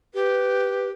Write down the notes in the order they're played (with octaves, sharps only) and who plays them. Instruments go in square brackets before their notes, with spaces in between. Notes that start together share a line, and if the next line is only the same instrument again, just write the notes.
[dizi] G4 [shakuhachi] B4